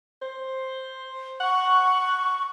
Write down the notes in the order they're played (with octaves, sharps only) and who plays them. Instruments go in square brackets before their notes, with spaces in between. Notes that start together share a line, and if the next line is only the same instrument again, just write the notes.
[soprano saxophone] C5
[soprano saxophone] F#5 [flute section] C#6